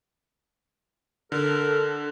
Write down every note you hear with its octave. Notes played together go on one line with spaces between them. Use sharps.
D3 A4 A#4